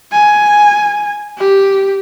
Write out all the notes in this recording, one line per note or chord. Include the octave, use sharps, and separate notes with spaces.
G#5
G4